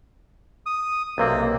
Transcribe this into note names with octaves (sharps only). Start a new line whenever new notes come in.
D#6
B1 C3 A#3 C4